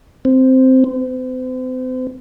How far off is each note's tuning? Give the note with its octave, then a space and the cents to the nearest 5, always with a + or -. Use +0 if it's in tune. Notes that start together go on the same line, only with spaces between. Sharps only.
C4 -5
C4 -40